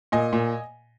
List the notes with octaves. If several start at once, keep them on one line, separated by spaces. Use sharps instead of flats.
A#2 D#5 G#5
A#2